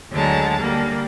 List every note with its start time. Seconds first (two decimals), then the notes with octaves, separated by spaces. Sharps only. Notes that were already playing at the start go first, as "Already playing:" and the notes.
0.12 D2 D3 F#3 G#3 A5 A#5
0.59 D3 G3 A#3